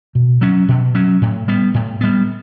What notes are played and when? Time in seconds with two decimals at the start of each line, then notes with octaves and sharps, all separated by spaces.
0.15 B2
0.41 F#3 C#4
0.68 B2
0.95 F#3 C#4
1.22 A2
1.48 G3 B3
1.74 A2
2.01 G3 B3